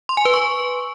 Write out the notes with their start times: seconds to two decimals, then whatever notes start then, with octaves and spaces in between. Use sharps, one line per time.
0.09 C6
0.17 G#5
0.25 B4
0.34 C#6